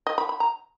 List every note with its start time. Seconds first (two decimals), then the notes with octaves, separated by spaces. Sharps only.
0.07 D#5
0.18 B5
0.29 B5
0.40 A#5